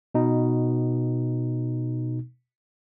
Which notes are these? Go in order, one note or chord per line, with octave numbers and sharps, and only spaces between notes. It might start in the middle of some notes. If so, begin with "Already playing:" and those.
B2 D#4